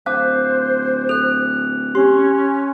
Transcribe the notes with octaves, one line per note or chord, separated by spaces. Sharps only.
D1 C5 F5 A5 D6 F#6
A4 F#6 F7
C#4 G4 C6